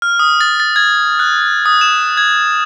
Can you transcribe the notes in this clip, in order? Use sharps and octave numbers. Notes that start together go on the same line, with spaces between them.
F6
D#6
A6
A6
G#6
F#6
D#6
E7
G#6